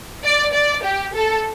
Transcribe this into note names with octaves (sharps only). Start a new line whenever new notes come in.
D5
D5
G4
A4